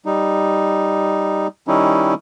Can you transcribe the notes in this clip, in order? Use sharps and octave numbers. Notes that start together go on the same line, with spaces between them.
G3 D#4
D#3 G3 C#4 D#4 E4